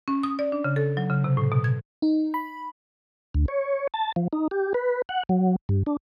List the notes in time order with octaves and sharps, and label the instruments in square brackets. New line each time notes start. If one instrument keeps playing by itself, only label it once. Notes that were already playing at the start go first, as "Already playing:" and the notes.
[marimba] C#4
D#6
D5
D4
C#3
A4
F#3
C#3
C3
A2
B2
G#6
[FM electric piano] D#4
B5
[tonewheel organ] D2
C#5
A5
F3
D#4
G4
B4
F#5
F#3
G2
D4